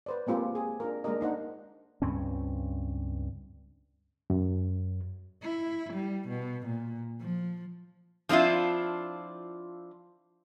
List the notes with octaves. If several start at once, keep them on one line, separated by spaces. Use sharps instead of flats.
B4 C5 D5
G#3 A#3 C4 F4 G4 G#4
G#4
D4 F4 A#4
G#3 A#3 D4 G4 A#4 D#5
D4 D#4 C5 F#5
C#2 G2 C4 C#4
F#2
E4
G3
B2
A#2
F3
F3 C4 D4 E4 F4